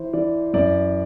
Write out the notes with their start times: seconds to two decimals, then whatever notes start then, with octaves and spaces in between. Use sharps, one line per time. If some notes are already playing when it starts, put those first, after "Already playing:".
Already playing: E3 C5
0.13 E3 D5
0.54 F#2 D5